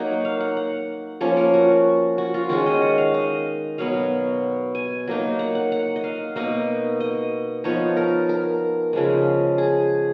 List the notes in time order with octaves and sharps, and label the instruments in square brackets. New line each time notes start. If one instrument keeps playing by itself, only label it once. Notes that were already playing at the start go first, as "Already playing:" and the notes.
Already playing: [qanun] F#3 A#3 D#4 F#5
F5
F#5
F#5
F3 A#3 C#4 C#5
A#4
F#4
F#4
F4
D#3 G#3 C#4 F#4
D#5
F#5
F5
D#5
B2 F#3 B3 F5
G#5
F#3 A#3 D#4
F#5
F#5
F#5
D#5
F5
B2 A#3 D#4 D#5
D#5
F3 B3 D#4 C#5
A#4
A#4
C#3 F3 G#3
G#4